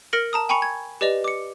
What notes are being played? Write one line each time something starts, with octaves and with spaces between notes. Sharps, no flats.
A#4 F6 A#6 C#7 D7 F#7
A5 A#5 D#6
G5 G#5 B5 C#6 C#7 F7
G#6
G4 B4 D5 D#5 F7
D6 C#7